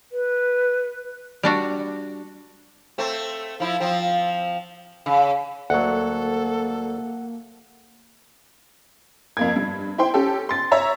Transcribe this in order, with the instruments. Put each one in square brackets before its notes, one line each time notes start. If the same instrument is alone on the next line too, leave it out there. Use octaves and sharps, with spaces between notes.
[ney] B4
[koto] G3 D4 F#4
[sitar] A3 C4
F3 E4
F3 C4
C#3
[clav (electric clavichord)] D2 F#3 [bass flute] A#3 [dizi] A4 [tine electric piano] F#5
[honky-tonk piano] F2 A#3 G#6
G2
E4 C5 G5 C6
C#4 G4 A4
C6 A6
C#5 E5 A#5 E6